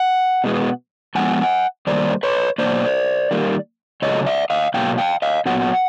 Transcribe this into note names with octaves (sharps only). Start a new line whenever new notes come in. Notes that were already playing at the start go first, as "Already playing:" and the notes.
Already playing: F#5
B2 G#3 B3
A2 F3 G#3 B3 F#5 G#5
D#3 G3 A#3 C5 D5
B4 C#5
B2 F#3 A#3 C5 D5
D#3 G3 A#3
C#3 F#3 A3 C#5 D#5
D5 E5
D#5 F5
B2 F#3 A#3 F5 G5
F5 G5
D#5 F5
A#2 F#3 B3 F#5